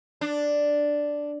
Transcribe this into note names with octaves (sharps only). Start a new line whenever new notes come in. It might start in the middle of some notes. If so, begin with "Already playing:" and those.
D4